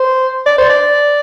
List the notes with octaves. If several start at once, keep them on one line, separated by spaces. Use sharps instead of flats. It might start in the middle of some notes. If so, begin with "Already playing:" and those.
Already playing: C5
D5
C5
D5